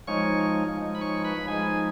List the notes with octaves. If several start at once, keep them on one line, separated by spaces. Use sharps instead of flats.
F3 G#3 D#4 C#5 C#6
F3 G#3 D#4
B5
C#5 C#6
B4 B5
F3 G#3 D#4 G#4 G#5